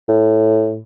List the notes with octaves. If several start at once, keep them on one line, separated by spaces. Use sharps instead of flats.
A2